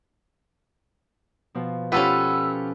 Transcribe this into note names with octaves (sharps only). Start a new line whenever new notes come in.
B2 F3
C#4 F4 G4 A4 B4 F#5 E6